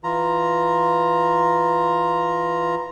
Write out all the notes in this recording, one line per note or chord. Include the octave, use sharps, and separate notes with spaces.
E3 F4 A#5